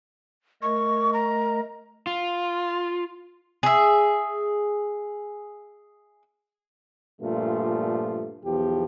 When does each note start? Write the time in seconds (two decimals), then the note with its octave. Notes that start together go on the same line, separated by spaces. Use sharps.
0.62 A3 A#4 D#5 C#6
1.13 A#5
2.07 F4
3.63 G#4 E5
7.22 G2 A#2 F3 A3 F4
8.45 B1 E2 F3 G4